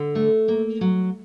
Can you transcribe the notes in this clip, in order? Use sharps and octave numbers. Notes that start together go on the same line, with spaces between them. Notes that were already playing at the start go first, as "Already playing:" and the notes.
Already playing: D3
A3
A#3
F#3